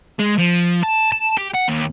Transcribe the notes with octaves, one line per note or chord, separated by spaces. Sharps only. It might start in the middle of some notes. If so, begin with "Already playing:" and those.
G#3
F3
A5
A5
G4
F#5
D#2